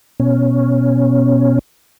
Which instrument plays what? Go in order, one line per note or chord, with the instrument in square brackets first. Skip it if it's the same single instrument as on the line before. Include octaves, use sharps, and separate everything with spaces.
[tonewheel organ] B2 C#4